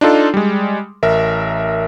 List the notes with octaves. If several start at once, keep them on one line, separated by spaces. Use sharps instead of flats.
D4 D#4 F4 A4
G3 G#3
A1 A#4 E5